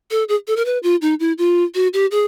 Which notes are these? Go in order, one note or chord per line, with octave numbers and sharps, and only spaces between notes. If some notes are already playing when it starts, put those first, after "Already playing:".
A4
G#4
A4
A#4
B4
F4
D#4
E4
F4
F#4
G4
G#4